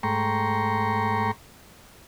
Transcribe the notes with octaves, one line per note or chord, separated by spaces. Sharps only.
G#2 A3 G5 A#5 C6 C#6